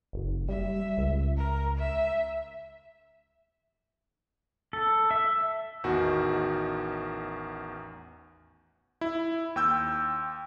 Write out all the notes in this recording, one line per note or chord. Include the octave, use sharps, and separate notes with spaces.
F#1
G3 E5
C#2
A#4
E5
A4
E5
A1 E2 D#3 F#4
E4
D#2 G5 E6 G6